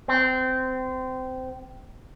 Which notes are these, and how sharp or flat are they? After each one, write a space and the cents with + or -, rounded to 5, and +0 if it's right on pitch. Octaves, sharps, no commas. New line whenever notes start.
C4 -20